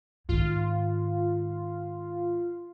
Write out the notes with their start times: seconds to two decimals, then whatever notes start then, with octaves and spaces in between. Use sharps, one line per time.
0.29 G#2 D#3 F4